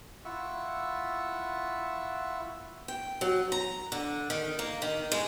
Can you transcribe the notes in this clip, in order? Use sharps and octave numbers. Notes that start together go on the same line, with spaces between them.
E4 F4 E5 F#5 C#6 E6
G5
F#3
A#5
D3
D#3
A#3
D#3
G#3